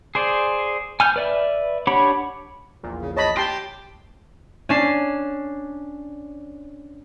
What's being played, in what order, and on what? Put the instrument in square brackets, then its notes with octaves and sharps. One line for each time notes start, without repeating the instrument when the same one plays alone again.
[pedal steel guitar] G#4 C5 D5
G#5 F6 G6
B4 D5 E5
D4 G4 C#5 F#5 B5
[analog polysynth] A#1 E2 A#2
[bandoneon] C#3
[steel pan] C#5 B5 [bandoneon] D#5 A5
[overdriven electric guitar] G4 [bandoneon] G5 [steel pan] A5 C6
[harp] C#4 D4 C7